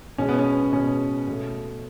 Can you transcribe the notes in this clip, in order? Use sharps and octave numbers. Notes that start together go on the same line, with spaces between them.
B2 G#3 C#4
B3
C#4
B2 G#3 C#4
B2 A3